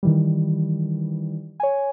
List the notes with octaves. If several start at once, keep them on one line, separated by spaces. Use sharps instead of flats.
D#3 E3 G3
C#5 G#5